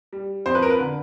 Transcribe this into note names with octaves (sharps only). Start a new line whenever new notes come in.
G3
F2 C5
B4
A#4
B4
D3